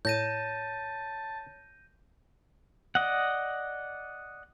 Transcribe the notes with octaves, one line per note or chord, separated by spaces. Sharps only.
A2 C#5 A5 G6 A#6 D#7
D5 D#5 F#5